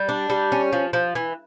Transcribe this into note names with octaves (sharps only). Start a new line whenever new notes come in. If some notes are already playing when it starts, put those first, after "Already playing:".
Already playing: G3
D4
G3
C#4
F3
F3
E3